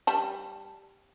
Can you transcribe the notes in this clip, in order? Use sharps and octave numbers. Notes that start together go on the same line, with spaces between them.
G3 A5